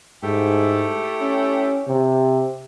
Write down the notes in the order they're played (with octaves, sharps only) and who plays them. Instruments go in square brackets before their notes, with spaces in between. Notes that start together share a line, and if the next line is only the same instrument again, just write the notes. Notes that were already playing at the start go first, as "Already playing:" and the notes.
[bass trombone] G#2 [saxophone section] A3 E4 G4
[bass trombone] C#4
C3